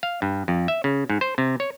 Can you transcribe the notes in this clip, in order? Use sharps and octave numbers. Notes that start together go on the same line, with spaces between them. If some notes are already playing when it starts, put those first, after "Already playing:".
F5
G2
F2
E5
C#3
G#2
C5
C3
C#5